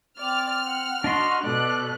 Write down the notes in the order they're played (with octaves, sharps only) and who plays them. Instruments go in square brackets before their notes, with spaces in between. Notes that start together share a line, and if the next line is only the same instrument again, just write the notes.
[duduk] C4 [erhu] D5 [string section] F6
[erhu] F#5
[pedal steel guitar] D4 D#5 C6 [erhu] F#4
[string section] B2 [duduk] A4 [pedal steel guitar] D5 [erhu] F#6